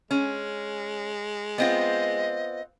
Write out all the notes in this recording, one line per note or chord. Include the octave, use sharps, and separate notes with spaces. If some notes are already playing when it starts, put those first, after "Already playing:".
G#3 C#4
B3 C4 F4 D#5